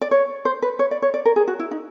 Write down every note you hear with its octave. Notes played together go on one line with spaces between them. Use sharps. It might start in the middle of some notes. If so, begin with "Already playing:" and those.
D5
C#5
C5
B4
C#5
D5
C#5
D5
A#4
G#4
F#4
E4
D#4